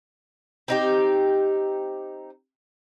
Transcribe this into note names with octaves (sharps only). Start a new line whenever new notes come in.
C4 D#4 G4